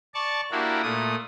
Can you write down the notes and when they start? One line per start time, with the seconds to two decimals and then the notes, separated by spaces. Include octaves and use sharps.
0.14 D5 A5 C#6
0.51 A#3 D4 E4 F#4 G4 A#4
0.83 A#2 A3 D#6